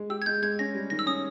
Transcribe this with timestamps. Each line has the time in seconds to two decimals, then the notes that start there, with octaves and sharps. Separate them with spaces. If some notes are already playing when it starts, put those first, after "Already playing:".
Already playing: G#3
0.10 G4 E6
0.22 G#6
0.26 G#3 G6
0.42 G#3 G#6
0.59 C#4 A#6
0.74 G3
0.90 D#3 A#6
0.99 E6
1.06 C#4 D#6